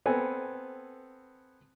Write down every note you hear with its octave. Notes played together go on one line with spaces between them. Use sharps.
B3 C4 A4 G#5